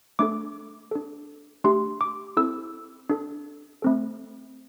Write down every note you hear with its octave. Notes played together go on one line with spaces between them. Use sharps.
A3 D4 A4 D6
D4 A4
A3 D4 G4 C6
D6
C4 E4 A4 E6
D4 A4
A3 C4 A4